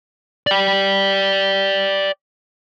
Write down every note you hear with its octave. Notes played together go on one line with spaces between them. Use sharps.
D5 G5